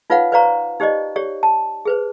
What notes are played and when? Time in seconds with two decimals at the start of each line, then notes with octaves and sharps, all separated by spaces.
0.10 D#4 F4 B4 C#5 F5 F#5
0.32 B4 C5 D5 F5 A#5 C#6
0.80 D#4 G4 C5 D5 D#5
1.16 G4 C#5 D5
1.43 A5
1.85 G#4 B4 C5